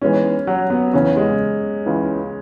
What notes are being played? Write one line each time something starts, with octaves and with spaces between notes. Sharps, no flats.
G#2 E3 G#3 B3 C#4
F#3
B3
E2 C#3 E3 C#4
G#3
C#2 C#3 E3